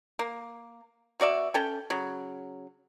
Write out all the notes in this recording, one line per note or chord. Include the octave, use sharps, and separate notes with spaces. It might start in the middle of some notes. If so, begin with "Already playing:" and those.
A#3
B2 F#4 D5 E5
C#4 A4 G5
C#3 F#3